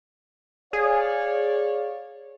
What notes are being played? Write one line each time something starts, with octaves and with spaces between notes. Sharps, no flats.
G#4 C#5 D5 F5